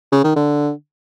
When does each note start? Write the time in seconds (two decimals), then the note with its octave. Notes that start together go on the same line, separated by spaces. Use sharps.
0.12 C#3
0.24 D#3
0.36 D3